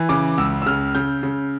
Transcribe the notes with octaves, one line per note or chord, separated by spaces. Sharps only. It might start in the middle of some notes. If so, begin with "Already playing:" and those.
Already playing: E3
C#3 D6
C#2 E6
E6
C#3 F6
C#3 G6
C#3